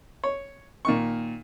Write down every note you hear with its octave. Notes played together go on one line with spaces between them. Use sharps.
C#5
A#2 D#3 C#6